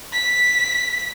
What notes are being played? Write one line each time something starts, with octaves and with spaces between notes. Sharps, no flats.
B6